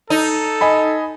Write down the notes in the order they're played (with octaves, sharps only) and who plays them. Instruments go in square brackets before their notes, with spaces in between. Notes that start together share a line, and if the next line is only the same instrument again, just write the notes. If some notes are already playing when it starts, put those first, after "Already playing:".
[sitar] D#4 [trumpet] A4
[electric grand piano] D#5 G#5 B5